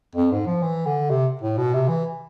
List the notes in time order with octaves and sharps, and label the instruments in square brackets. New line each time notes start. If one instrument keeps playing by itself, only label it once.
[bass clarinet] F2
G#2
F3
E3
D3
C3
A2
B2
C3
E3